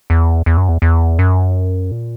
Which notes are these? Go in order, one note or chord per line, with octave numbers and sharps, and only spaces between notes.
E2
E2
F#2
E2
E2
F#2
A#2